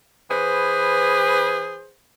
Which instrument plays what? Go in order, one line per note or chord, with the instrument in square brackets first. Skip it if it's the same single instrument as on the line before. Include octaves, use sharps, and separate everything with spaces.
[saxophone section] E3 G#4 B4 C5